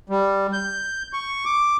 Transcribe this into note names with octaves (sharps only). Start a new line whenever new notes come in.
G3
G6
C#6
D6